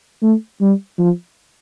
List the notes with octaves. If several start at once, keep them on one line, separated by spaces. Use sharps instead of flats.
A3
G3
F3